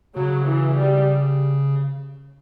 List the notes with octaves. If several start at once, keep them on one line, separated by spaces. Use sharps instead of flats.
C#3 F#3
E3
G3